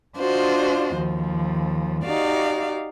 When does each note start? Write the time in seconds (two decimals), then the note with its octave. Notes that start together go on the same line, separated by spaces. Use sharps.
0.19 D4 F4 F#4 C5 D#5
0.96 D#2 F3
2.04 D#4 F#4 G4 D5 F5